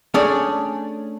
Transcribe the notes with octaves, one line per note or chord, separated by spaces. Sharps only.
A3 C#4 D4 G#4 D5